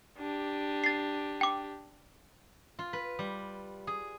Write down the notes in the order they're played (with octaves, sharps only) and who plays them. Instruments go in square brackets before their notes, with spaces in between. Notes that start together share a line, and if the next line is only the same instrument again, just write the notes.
[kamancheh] D4 G4
[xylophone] A6 C7
G5 D6
[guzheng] F4
B4
G3
G#4